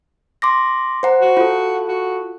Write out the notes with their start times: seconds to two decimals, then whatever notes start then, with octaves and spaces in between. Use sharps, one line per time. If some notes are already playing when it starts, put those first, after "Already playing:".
0.42 C6 D6 A#6
1.03 C5 F#5 A#5
1.22 F#4
1.37 F4 A4
1.88 F#4